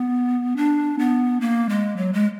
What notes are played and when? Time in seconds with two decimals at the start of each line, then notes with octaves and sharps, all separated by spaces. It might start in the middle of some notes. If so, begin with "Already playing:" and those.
Already playing: B3
0.57 D4
0.99 B3
1.41 A#3
1.69 G#3
1.97 F#3
2.13 G#3